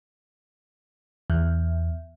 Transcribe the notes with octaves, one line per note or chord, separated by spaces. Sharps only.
E2